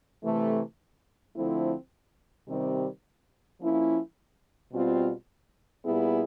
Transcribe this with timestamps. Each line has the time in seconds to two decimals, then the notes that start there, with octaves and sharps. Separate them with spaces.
0.23 C3 E3 A3
1.35 D3 F3 A3 C4 E4
2.47 C3 D#3 G3 C4
3.59 F3 A#3 C#4 E4
4.72 B2 G3 C4 F4
5.84 A#2 G3 B3 E4 G#4